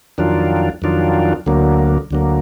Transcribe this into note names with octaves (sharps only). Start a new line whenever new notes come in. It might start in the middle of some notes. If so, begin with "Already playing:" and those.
F2 D#3 F#3 D4 F4
F2 D#3 F#3 D4 F4
D2 D3 F#3 A#3
D2 D3 F#3 A#3